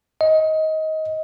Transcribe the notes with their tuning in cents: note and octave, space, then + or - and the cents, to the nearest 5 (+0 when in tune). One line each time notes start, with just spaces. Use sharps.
D#5 +20